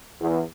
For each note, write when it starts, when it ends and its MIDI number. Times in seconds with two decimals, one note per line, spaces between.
0.21 0.40 40